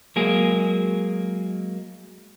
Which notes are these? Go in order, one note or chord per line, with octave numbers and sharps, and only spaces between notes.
F#3 G#3 A#3 G#4